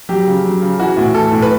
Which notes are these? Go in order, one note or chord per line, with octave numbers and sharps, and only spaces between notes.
F#3 G4
C#3
F#3
C#3
E3 F#4
A2
E3 A4
A2
B4